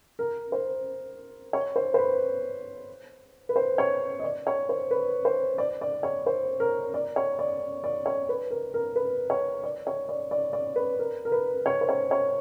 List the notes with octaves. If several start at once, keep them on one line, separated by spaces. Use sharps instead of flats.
A#4
C5
C#5
C5
C5
B4
B4
C5
C#5
D#5
D5
C#5
C5
B4
C5
D5
D5
C#5
C5
A#4
D5
C#5
D5
D5
C#5
B4
A#4
A#4
B4
C#5
D5
C#5
D5
D5
D5
B4
A#4
A#4
B4
C#5
C5
C#5
C#5